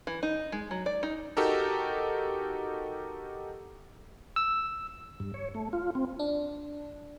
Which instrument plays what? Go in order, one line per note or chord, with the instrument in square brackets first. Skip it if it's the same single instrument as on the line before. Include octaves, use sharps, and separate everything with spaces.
[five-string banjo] E3
D#4
G#3
F#3
D5
D#4
[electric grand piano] D#4 F#4 G4 A4 A#4
[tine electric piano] E6
[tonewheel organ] G2
C#5
A3
F4
C4
[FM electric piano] D4